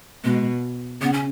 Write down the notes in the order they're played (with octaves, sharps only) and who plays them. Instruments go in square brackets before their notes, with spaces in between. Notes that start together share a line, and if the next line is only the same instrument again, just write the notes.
[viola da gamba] B2 [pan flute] G#3
[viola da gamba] C#3 [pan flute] B3
[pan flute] C#4